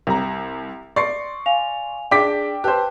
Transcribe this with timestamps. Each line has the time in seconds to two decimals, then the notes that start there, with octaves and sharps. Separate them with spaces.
0.07 C2 G4 A#5
0.96 D5 C6 C#6 C7
1.46 F5 G#5 F7
2.11 D4 G#4 G5 D6 B6
2.64 G4 B4 C5 A5 F#6